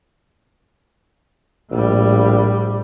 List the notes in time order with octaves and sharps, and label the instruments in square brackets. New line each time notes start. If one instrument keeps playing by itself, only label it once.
[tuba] A#1 [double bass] A2 G3